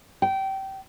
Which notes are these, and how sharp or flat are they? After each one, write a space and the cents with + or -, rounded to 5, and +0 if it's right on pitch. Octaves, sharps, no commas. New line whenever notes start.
G5 -20